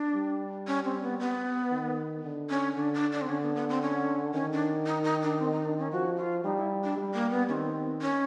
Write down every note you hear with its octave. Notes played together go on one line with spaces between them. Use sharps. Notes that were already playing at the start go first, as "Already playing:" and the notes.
Already playing: D4
G3
C#4
C4
B3
B3
D#3
D3
C#4
D3 D4
D4
D4
C4
D3 C#4
B3
B3
C4
C#4
D#3 C#4
D4
D#4
D#4
D4
C4
D#4
D4
C#4
F3 F#4
F4
G3 D#4
E4
D4
G3
A#3
B3
D#3 C4 C#4
C#4